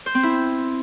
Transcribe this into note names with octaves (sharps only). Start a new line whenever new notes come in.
C5
C4
E4